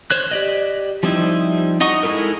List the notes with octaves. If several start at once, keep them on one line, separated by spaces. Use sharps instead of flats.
C5 C#5 F#6
G4 D5 D#5
F3 G3 C4 D#4 E4
D#4 D#5 F#5 C#6 D#6
G#3 D#4 E4 A4 A#4